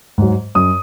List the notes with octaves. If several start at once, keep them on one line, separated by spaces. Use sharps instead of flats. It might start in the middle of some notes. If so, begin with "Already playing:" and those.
G#2 F#3
F#2 D#6